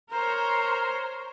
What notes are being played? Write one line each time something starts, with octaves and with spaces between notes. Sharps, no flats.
A#4 C5 C#5 A#5